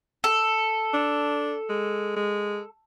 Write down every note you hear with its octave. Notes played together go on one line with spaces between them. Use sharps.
A4
D4
G#3
G#3